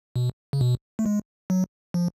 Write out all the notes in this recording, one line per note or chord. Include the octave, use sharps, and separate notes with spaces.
B2
C#3
B2
A3
G#3
F#3
F3